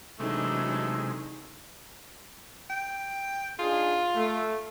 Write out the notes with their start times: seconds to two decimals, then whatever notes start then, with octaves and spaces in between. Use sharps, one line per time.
0.20 C3 E3 F#3 G#3 A3 D4 D#4
2.70 G5
3.59 D4 D#4 F4 G#4
4.16 A3